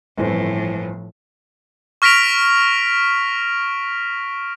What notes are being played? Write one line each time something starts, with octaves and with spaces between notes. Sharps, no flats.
G1 A2 E3 F3 C4
C#6 F6 A#6 B6 D7 F7